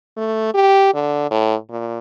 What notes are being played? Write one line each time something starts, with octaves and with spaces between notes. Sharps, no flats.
A3
G4
D3
A2
A#2